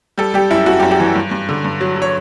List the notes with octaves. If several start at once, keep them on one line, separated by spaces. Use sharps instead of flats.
G3 A4
G3 G4
F#2 E4
F#2 F#4
G4
F#2
G4
E3
G2
G2
D3
G2
F#3
F#3
C#5